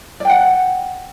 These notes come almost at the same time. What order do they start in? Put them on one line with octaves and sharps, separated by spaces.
D5 G5 F#5